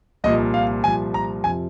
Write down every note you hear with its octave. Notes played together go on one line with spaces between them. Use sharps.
C2 A#2 F3 D#5
F5
C2 A#2 F3 G#5
A#5
F2 C3 F3 G#5